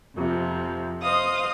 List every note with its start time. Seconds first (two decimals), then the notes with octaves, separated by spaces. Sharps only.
0.15 F2 C3 F3
1.01 C5 D#5 F5 D#6